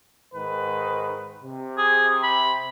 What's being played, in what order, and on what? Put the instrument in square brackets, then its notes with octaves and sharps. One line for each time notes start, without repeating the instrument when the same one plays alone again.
[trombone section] G#2 D#3 B4
C3
[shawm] G#4
B5